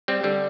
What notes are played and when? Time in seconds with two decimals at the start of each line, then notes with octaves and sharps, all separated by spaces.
0.08 G3 C4
0.23 D3 G3